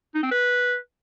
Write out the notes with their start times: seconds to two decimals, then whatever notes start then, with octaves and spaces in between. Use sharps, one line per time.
0.15 D#4
0.23 C4
0.31 B4